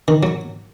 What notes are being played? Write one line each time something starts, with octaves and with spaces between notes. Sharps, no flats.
D#3
F#3